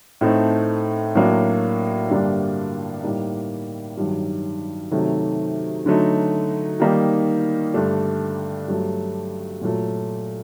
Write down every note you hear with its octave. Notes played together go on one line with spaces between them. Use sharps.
A2 A3 C4 D#4
A2 F#3 A#3 D4
G2 D3 G3 A#3 D4
A2 G3 A#3 D#4
G2 D#3 F#3
C3 D#3 F#3 A3
D3 F#3 A3 D#4
D#3 G3 A#3 D#4
G2 D3 A3 D4
G2 F#3 A3
A#2 F#3 A3